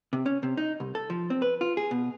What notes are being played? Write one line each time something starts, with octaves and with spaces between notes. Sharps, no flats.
C3
C#4
C3
D#4
C2
A4
F3
C4
B4
F4
G#4
B2